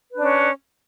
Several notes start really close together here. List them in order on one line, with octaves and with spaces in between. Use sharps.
B4 D4 C#4